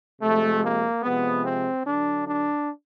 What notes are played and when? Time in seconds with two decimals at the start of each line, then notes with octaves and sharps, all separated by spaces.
0.21 C3 F3 G#3 A3
0.62 A#3
1.03 C3 F3 G#3 B3
1.44 C4
1.85 D3 F#3 D4
2.26 D4